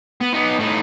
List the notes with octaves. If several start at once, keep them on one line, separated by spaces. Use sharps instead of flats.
B3
B3 D#4
A2 D#4